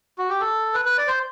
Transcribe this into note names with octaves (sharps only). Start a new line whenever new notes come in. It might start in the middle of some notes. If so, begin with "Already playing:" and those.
F#4
G4
A4
B4
B4
D5
C5